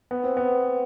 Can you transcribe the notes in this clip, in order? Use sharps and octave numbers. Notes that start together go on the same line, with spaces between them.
B3
C4
B3